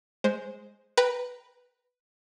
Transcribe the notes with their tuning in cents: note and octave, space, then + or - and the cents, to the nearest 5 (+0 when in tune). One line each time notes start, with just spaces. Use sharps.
G#3 +0 C5 +0
B4 +0 G5 +0 A#5 +0